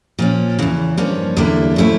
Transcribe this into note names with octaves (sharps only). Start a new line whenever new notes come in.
A#2 F3 C#4
E2 C#3 E3
G2 F3 A#3 C#4
E2 D3 G3 A#3 E4
C#3 F3 A3 E4